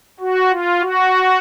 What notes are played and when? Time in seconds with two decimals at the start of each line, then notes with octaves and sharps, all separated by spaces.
0.20 F#4
0.51 F4
0.81 F#4